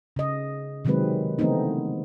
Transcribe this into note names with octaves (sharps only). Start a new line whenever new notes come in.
C#3 D#5
C3 D#3 F#3 G#3 C4 B4
C#3 E3 A3 B3 C4 D#4